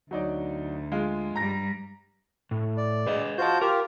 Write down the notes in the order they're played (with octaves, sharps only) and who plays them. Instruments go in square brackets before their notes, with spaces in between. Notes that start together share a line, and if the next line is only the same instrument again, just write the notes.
[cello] D2 [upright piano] F#3 D#4 D5
[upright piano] G#3 F4
[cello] G2 G3 [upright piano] A#5 A#6
[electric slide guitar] A2
[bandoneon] D5
[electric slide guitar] G#4 B4 D#5
[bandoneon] F4 F#4 G6 [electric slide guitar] C5 A5
[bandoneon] F4 G4 [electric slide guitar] A#4